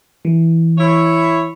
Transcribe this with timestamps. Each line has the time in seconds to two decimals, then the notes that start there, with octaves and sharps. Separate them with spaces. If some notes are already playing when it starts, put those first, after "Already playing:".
0.25 E3
0.78 E4 C#5